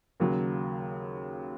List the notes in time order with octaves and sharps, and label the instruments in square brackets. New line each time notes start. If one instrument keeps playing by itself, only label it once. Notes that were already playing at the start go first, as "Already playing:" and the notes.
[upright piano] D#2 C#3 F#3